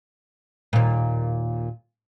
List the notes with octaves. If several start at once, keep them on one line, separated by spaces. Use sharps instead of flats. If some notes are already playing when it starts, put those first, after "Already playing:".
D#2 A#2